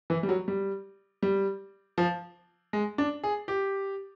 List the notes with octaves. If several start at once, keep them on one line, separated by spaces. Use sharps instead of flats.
E3
G3
F#3
G3
G3
F3
G#3
D4
G#4
G4